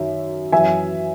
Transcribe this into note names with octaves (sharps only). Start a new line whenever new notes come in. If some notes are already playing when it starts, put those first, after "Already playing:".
Already playing: F#2 D#3 F#3 E5
F#2 E3 E5 G#5